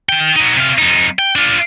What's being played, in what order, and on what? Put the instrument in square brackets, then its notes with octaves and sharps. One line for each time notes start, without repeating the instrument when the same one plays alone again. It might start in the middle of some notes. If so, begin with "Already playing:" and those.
[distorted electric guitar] D#3 G5
D#4 F#4
C3 F5
F2 D#4
G5
D4 F4